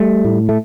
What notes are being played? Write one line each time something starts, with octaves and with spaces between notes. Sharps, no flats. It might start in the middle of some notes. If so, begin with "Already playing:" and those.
Already playing: G3 A3
A2
A3